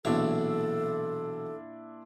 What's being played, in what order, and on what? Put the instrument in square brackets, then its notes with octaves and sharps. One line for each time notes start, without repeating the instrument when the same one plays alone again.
[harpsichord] B1 E2 C#5 [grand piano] A#2 D4 E4 [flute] A4